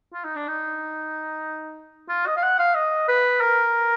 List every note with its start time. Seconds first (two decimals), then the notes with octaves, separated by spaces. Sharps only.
0.13 F4
0.24 D#4
0.36 D4
0.48 D#4
2.09 F4
2.26 D#5
2.36 F5
2.43 F#5
2.59 F5
2.75 D#5
3.08 B4
3.41 A#4